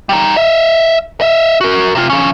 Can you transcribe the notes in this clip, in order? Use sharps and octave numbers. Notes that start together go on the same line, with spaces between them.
G3 D#4
D#5 E5
D#5 E5
F#4 A#4
C3 F4
F3 C#4